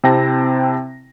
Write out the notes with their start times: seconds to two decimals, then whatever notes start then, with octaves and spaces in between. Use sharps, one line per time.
0.04 C3 C4 E4 G5 A5 A#6